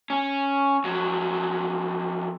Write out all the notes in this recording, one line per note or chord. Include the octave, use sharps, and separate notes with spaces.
C#4
F2 F#3